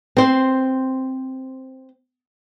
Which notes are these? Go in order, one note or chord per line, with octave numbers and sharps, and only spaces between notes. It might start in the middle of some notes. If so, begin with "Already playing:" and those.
C4 C5